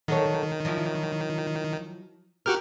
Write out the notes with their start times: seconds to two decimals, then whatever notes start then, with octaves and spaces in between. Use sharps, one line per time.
0.08 D#3 F#3 A4 C#5
0.65 F3 F#3 E4
2.46 F#4 G4 A#4 F6